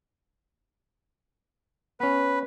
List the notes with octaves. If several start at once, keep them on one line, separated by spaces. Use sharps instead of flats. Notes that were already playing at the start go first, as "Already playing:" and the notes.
B3 C#4 B4